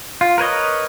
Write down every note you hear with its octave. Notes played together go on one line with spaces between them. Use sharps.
F4
A#4 B4 C#5 D#5